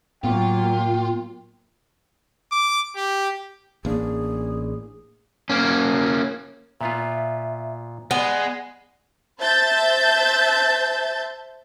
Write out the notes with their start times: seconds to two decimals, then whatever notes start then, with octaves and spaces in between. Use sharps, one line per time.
0.24 A2 F#3 A#3 B3 F4 G5
2.52 D6
2.96 G4
3.85 A1 A#3 D4 G#4
5.50 A#3 C#4
6.81 A#2 B3 F4 E5
8.11 G#3 B3 D5
9.40 C5 E5 A5 G6 A6